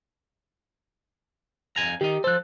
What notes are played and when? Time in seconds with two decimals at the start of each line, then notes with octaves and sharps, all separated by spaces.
1.76 F2 G#5 A#5
2.01 D#3 D#4 G4
2.24 F3 A4 C5 F#6